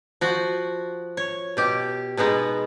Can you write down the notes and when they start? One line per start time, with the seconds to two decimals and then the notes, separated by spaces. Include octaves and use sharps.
0.21 F3 F#4
1.17 C#5
1.57 B2 G4
2.17 B2 G#3 B3 D#4